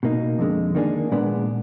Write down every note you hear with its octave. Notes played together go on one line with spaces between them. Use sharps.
B2 A#3 D#4
F2 D3 G#3
D#3 A#3 D4 G#4
A#2 G#3 B3 D4